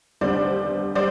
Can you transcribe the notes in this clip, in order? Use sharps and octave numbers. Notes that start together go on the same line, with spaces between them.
F1 D#2 D3 G3 B3 C5 D5
G3 C5 D5